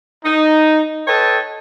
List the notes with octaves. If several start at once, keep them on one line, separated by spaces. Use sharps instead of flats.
D#4
A4 B4 C#5 D#5 G5 A5